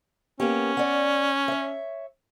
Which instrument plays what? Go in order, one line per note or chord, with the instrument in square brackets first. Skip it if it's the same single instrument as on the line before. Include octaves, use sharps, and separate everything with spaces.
[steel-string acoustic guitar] A#3 B3 G4 [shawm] C#4
[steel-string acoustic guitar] D5 F#5
C#5 E5